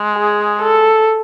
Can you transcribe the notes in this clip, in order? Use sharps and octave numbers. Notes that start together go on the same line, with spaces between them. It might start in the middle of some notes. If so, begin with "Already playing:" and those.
Already playing: G#3
G#4
A4